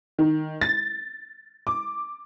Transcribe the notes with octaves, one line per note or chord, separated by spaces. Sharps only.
D#3
A6
D6